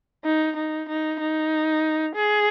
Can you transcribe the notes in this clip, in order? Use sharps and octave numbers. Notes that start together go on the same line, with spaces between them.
D#4
D#4
D#4
D#4
G#4